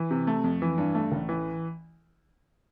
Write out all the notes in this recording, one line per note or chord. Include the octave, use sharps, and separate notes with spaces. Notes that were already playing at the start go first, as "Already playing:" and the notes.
Already playing: E3
C3
A3
F2
E3
G2
A3
A1
E3